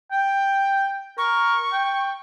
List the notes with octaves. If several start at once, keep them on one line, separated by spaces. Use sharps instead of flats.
G5
A#4 C#6
G5